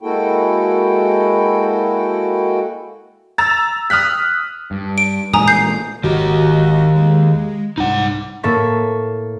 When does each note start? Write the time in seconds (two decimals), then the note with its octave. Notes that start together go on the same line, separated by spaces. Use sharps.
0.01 G#3 A#3 E4 F#4 A4 G5
3.38 A#5 E6 A6
3.90 D#6 F6 F#6 B6
4.71 G2
4.98 D7
5.34 A1 A#2 G#3 G#5 A#5 D#6
5.48 G6 C7
6.04 G#1 D#3 F#4 G4 D#5
6.96 G#3
7.78 C2 G#2 D#4 F#5
8.43 A2 A#3 A4 C#6 B6